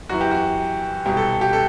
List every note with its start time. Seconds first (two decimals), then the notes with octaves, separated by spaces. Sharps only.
0.09 F#2 E3 F#4
0.21 G4
0.31 F#4
1.06 C2 B2 G4
1.17 A4
1.41 G4
1.53 A4